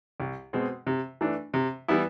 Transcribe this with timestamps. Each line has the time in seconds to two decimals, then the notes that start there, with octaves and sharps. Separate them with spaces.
0.20 C2
0.53 B2 G#3 C4
0.87 C3
1.21 E3 A3 D4
1.54 C3
1.88 E3 G3 B3 E4